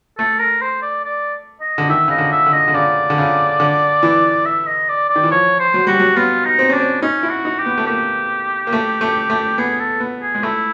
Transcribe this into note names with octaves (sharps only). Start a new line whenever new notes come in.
A3 A4
A#4
C5
D5
D5
D#5
D3
D#3 E5
C#3 D#5
D3
E5
D3
D#5
D3
C#3 D5
D3
C#3
D3
E3
E5
D#5
D5
D5
D#3
E3
F3 C#5
C5
F#3
G3 F#4
F#3
B3 F4
D#4
C4
C#4 D4
C4
C#4 D#4
E4
F#4
D#4
G4
B3
A3
A#3 G4
A#3
A3
A3
A3
B3 G#4
A4
B3
G#4
G#3
A3 E4